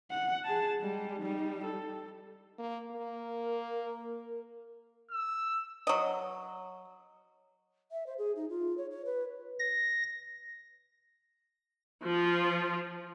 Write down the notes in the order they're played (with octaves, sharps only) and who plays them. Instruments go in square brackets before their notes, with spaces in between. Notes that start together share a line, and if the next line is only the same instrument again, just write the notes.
[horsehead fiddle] F#5
G#4 A5
G3 G#3
G3 D#4
A4
[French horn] A#3
[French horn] A#3 [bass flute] A#4
[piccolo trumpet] E6
[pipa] F#3 D#5
[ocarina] E5
C5
G#4
D#4
F4
C#5
C#5
B4
[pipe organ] A#6
[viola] F3 F4